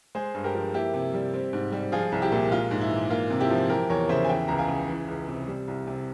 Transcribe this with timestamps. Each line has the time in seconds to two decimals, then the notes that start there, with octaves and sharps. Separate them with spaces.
0.15 G#3 G#4 C5
0.34 G2
0.44 G4 A#4
0.54 F3
0.74 A#3 E4 G4
0.94 C3
1.14 G3
1.34 C4
1.53 G#2
1.72 G3
1.92 F3 F4 G#4
2.12 C2
2.22 E4 G4
2.32 A#2
2.51 G#3 F4
2.71 G#2
2.81 E4
2.91 E3
3.10 A#3 F4
3.30 C3
3.40 E4 G4
3.50 F3
3.69 E3 G4 A#4
3.90 E2 A#4 C#5
4.09 C#3 C5 E5
4.25 G#5
4.29 E3 E5 G5
4.48 C#2 A#5
4.59 F5 G#5
4.68 C#3
4.88 E3
5.08 C#2
5.28 C3
5.48 G3
5.68 C2
5.87 C3